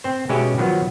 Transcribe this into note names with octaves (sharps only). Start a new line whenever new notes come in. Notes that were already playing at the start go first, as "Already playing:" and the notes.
C4 C5
B2 G#3 C#4 G4 E5
D#3 F3 F#3 B3